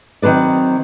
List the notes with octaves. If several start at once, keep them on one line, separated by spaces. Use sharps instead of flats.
D#3 F#3 C4 B4 D5